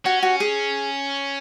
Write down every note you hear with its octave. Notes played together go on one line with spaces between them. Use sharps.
C#4 F#4
F#4
G#4